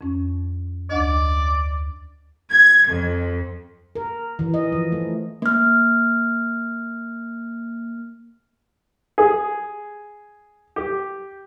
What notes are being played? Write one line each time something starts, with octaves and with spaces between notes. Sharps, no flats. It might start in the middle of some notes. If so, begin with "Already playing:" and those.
F2 C#4
D2 D4 D5 D#5
G#6
F2
A#4
E3
D#5
F3
A3
A#3 F6
G#4
G4